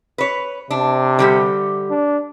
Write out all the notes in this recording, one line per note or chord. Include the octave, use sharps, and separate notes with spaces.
B4 C#5
C3 D4
D3 G3 G4
D4